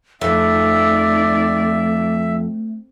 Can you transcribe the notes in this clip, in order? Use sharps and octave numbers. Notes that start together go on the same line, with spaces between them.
F2 A3 D#4 D5 E5